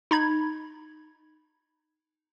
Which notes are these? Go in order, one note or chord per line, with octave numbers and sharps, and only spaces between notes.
D#4 B5 G#6